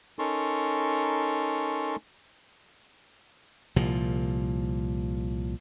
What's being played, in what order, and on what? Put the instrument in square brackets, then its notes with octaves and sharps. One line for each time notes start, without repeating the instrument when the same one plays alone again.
[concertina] C#4 D#4 A4 A#4 C6 C#6
[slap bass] C2 A#2 F3